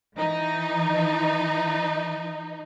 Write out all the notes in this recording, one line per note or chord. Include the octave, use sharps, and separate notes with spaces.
E3 D#4